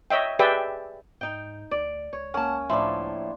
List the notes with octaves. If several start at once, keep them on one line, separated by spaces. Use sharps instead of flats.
C#5 D#5 E5 G5
G4 G#4 B4 D5 E5 G5
G#2 D#4 G5
D2 D5
C#2 C#5
A#3 C#4 F#5 A5
A2 F3 D4 E4 C6